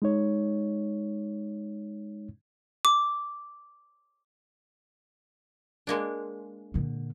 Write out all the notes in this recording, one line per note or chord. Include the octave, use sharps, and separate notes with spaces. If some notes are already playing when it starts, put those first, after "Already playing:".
G#3 D#4 C#5
D6
G#3 A#3 D4
A#2 D3